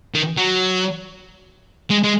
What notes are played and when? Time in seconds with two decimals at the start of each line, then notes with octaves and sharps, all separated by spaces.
0.14 D#3
0.37 F#3
1.90 G#3
2.04 G#3